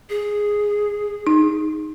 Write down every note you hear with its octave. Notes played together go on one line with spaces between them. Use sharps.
G#4
D#4